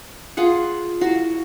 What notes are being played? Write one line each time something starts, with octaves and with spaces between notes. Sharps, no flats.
F4 G#4 F#5
E4 F#4 F5